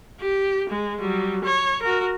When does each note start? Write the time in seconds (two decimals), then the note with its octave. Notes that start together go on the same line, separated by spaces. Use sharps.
0.20 G4
0.69 G#3
1.00 F#3 G3
1.44 C#5
1.82 F#4 A#4